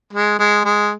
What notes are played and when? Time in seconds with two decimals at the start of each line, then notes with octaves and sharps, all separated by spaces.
0.13 G#3
0.39 G#3
0.65 G#3